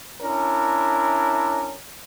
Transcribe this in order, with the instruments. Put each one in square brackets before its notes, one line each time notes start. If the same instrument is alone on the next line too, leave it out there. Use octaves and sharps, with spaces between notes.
[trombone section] C#4 D4 E4 A#4